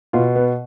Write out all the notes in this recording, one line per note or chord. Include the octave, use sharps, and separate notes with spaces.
B2 F4
B3